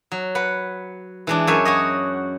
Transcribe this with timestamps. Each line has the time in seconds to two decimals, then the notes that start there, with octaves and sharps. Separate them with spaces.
0.12 F#3
0.35 B4 F#5
1.27 E3 G#3 D4
1.47 F#2 C#5 E5 G#5
1.65 F#4 C#5 D#5